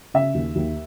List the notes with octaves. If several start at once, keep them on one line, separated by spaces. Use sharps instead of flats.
C#3 E5
D#2
D#2